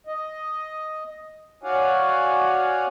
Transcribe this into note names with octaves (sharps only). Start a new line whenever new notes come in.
D#5
F#4 C#5 D5 F5 F#5 G#5